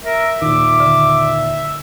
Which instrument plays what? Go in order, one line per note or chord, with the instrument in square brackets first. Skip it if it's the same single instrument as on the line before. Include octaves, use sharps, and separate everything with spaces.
[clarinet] A#4 [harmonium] E5
[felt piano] D#2 A#2 [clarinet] D6
[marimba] D3